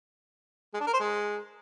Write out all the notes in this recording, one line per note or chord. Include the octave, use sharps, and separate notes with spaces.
G#3
D4
A#4
C5
G#3